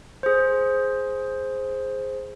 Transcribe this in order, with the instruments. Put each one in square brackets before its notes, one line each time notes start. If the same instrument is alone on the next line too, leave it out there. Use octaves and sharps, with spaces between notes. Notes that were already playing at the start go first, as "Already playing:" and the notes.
[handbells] G#4 C5